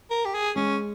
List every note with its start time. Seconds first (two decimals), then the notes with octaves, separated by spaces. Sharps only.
0.11 A#4
0.25 G4
0.34 G#4
0.56 G#3 C#4